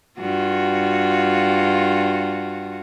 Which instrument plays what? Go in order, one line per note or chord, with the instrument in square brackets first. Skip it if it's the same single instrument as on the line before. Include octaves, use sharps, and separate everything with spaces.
[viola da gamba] G2 F4 F#4